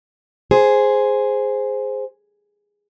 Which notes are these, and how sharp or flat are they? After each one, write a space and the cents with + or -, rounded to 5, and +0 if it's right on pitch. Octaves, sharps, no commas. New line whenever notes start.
G#4 +0 C5 +0